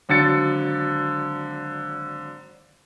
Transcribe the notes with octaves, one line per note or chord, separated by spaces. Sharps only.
G#1 D3 F#3 A6 C#7